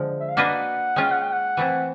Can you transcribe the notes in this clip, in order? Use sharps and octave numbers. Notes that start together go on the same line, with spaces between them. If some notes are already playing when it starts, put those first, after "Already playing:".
Already playing: D3 F3 G#3
E5
F5
A#3 D4 F#4 B4 D#5 F#5
G#3 C#4 F4 G5
F#5
G5
F#5
E3 A3 C4 E4